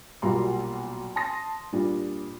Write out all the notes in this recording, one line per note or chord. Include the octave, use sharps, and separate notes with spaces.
B1 A#2 G3 F#4 A#5 C6
A5 C6 D#6 A#6
A#2 G3 D4 F4